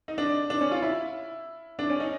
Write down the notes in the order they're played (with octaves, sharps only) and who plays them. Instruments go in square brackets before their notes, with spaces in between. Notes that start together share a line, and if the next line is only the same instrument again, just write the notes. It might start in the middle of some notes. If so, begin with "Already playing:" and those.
[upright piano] D#4
D4
D4
C#4
F4
E4
D4
C#4
D#4